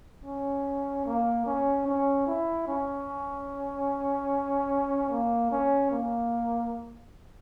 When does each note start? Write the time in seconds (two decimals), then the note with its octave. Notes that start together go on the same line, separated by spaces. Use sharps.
0.24 C#4
1.05 A#3
1.46 C#4
1.86 C#4
2.26 E4
2.67 C#4
5.10 A#3
5.51 C#4
5.91 A#3